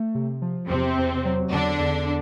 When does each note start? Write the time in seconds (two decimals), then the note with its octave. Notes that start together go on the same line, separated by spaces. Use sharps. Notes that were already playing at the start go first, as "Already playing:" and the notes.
Already playing: A3
0.15 C3
0.42 F3
0.69 E2 C3 C4
0.98 E2
1.25 F#3
1.52 E2 D3 D4
1.80 E2